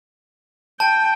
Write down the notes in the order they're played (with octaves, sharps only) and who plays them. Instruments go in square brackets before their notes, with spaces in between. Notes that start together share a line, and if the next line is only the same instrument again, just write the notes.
[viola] G5 [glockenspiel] A5